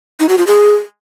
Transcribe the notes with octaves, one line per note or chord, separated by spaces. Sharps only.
D#4
F#4
F4
G#4